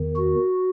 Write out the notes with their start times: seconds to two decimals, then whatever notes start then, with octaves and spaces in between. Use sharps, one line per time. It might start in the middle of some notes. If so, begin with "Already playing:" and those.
Already playing: E2 D#3
0.16 F#4